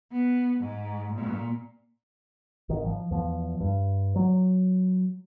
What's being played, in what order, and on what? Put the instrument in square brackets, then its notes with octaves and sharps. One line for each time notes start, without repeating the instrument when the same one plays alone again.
[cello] B3
G#2
A#2
[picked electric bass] G#1 D#3
F3
E2 F3
G2
F#3